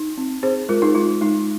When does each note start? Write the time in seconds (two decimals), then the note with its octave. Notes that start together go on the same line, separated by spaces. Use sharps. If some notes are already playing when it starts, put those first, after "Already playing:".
Already playing: D#4
0.18 C4
0.43 C4 G#4 C5
0.69 G#3 F4 A#4
0.82 D#4 G#4
0.95 G#3 F4
1.21 G#3 D#4